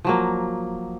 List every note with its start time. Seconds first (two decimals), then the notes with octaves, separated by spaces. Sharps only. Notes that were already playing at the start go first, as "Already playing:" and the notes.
0.04 F3 F#3 A#3